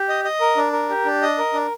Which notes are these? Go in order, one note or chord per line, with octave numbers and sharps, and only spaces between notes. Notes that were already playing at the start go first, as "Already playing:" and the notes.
Already playing: G4
D#5
D#5
A#4
D4
A#4
G4
D4
D#5
A#4
D4